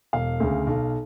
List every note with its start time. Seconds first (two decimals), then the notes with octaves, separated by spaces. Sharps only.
0.13 E1 F5
0.40 D2 C#3
0.67 B1